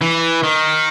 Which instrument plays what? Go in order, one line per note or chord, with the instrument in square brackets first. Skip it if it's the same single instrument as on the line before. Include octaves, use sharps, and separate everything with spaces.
[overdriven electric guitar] E3
D#3